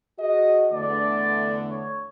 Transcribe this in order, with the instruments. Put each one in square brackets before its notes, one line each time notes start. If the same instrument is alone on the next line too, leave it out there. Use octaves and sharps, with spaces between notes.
[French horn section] F#4 G#4 D#5
[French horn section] E2 D3 A3 [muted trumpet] D5
[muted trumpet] C#5